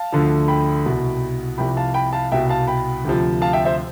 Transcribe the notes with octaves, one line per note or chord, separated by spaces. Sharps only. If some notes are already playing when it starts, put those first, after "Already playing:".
Already playing: F5 A5
D2 D3 F3
G5 B5
C2 B2
C2 C3 F3 G5 B5
F5 A5
G5 B5
F5 A5
C2 B2 E5 G5
F5 A5
G5 B5
D2 C3 F3
F5 A5
E5 G5
C5 E5